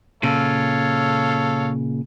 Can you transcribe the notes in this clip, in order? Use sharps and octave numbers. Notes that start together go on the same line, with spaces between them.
A#2 C#3 A4 C#5 F5